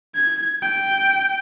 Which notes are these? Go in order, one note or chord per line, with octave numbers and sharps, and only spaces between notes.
G#6
G5